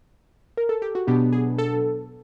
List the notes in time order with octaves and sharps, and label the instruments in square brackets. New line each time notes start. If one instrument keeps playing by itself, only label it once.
[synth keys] A#4
A4
G4
F#4
B2 F#3 B3 D4 G4
G#4
A4